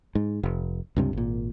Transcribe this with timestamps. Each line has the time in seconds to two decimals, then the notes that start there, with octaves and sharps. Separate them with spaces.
0.15 G#2
0.43 F1
0.96 C#2 G2 C3
1.13 G#1 A#2